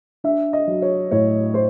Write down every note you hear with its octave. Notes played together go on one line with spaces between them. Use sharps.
D4 E5
D#5
F#3
C#5
A2 C#5
C5